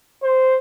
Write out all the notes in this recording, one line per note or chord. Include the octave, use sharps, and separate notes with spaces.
C5